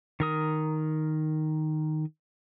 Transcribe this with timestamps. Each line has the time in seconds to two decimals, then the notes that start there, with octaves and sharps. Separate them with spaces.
0.20 D#3 A#4 D#6